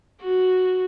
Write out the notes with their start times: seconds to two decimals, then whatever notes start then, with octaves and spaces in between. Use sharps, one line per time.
0.21 F#4